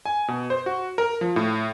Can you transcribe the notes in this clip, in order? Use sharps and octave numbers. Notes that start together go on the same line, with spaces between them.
G#5
B2
C5
F#4
A#4
F3
A2